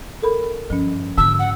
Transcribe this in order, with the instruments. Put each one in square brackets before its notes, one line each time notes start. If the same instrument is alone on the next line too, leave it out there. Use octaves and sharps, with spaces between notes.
[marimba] A4 A#4 B5
[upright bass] G2 [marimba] F3 C#4
[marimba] G#2 [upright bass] D3 A#3 [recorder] E6
[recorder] F#5